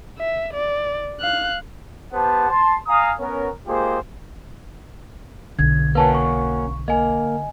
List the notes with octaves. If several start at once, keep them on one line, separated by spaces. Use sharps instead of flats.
E5
D5
F5 F#6
B3 G4 C5 F#5 A5
A5 C6
F5 G#5 A#5 D#6
B3 C#4 A#4
G#3 A#3 F4 G4 G#4 C5
B1 D3 G#6
A#3 C#4 F#4 B4 A5
C#6
A#3 D#5 G#5